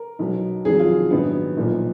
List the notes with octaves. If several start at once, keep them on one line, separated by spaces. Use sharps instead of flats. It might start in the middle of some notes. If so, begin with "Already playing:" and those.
Already playing: A#4
B1 B2 F#3
F2 D#3 F#3 G#4
F4
A#1 G#2 D#3 F#3 B3
B1 A#2 F3